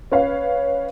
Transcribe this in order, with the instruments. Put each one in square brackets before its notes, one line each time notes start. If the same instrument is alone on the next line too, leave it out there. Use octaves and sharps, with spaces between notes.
[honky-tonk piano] C#4 B4 C#5 F5